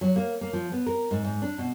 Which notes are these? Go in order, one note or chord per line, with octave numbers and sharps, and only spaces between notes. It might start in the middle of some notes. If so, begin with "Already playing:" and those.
F#3
A#3
A#3
F3
B3
A#4
G#2
G#2
D4
B2